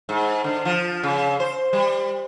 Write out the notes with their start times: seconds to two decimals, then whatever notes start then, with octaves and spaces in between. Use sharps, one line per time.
0.09 G#2
0.44 D3
0.65 F3
1.03 C#3
1.40 C5
1.73 G3